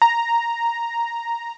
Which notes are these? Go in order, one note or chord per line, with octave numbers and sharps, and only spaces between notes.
A#5